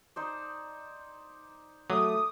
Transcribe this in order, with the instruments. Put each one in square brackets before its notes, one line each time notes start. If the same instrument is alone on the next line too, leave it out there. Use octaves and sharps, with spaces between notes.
[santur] D#4 C5 D5
[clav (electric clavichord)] F#3 [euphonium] A3 [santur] D6 [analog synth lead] D#6